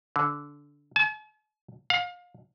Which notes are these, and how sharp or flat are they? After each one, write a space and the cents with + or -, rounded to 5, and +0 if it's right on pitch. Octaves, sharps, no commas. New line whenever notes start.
D3 -15
A5 -45
F5 +30